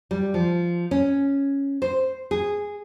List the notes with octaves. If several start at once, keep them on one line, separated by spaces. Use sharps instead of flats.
G3
F3
C#4
C5
G#4